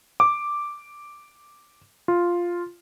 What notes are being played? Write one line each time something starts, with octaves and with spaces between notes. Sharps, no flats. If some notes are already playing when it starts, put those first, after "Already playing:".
D6
F4